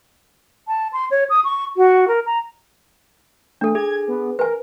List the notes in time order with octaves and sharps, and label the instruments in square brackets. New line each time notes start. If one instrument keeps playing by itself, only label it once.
[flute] A5
C6
C#5
D#6
C#6
F#4
A#4
A#5
[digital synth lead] A3 [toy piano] D4 A4
[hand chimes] G#4 [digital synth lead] G#6
[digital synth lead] B3
[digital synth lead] A#4 [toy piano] B4 G#5